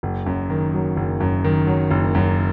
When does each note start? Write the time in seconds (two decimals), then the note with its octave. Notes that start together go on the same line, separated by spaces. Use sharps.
0.03 F#1
0.26 F#2
0.50 D#3
0.73 F#3
0.97 F#1
1.20 F#2
1.44 D#3
1.67 F#3
1.91 F#1
2.15 F#2